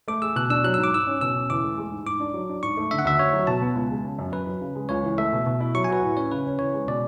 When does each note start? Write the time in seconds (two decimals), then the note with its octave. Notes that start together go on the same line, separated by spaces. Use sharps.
0.08 A3 D6
0.22 G#4 E6
0.36 B2 F#6
0.50 D4 E6
0.64 F#3 F#6
0.74 G#2 E6
0.83 D6
0.93 G#2 E6
1.07 C#4
1.21 B2 E6
1.35 C#4
1.50 E2 D6
1.64 A3
1.78 G#3
1.92 G#2
2.06 G#2 D6
2.20 D4
2.34 F#3
2.49 D4
2.63 G#2 C#6
2.77 A3
2.91 D3 E5
2.99 F#5
3.05 D2 E5
3.19 D2 C#5
3.33 F#3
3.47 B2 A5
3.62 B3
3.76 C#2
3.91 G#3
4.05 C#3
4.19 F#2
4.32 F#2 B4
4.47 F#3
4.61 C#3
4.75 G#3
4.89 C#2 C#5
5.03 E3
5.18 A3 E5
5.33 B2
5.46 B2
5.60 E4
5.75 F#3 C#6
5.84 G#5
5.89 F#4 B4
6.03 A2
6.17 C#4 C#5
6.31 C#3 B4
6.45 C#4
6.59 E2 C#5
6.74 G#3
6.87 B2 D5